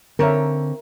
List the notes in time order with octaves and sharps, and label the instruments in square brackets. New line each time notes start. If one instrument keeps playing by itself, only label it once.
[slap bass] D3 [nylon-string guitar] C4 C#5 [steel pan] A#4 E5